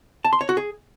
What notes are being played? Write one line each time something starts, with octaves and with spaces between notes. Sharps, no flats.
A5
C6
C#5
F#4
G#4